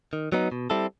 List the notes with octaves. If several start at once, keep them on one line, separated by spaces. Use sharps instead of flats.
D#3
F#3 B3 D#4
B2
G3 C4 E4 A4